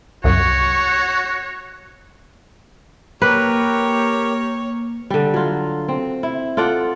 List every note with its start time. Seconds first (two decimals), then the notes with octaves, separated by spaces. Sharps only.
0.24 C2 F#2 F#4 C#5
3.22 A#3 G4 A#4 B4 C#5
5.10 D3 G3
5.34 F#3 F4
5.88 C4
6.23 E4
6.57 F4 A4 D5 F#5